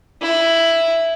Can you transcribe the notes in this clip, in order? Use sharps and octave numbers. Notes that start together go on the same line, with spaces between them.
E4